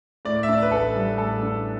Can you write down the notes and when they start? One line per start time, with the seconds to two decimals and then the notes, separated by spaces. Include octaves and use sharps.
0.25 A2 D5
0.43 E5
0.49 D4 D5
0.62 B4
0.71 A1 A4
0.95 G3
1.18 A2 A4
1.42 D4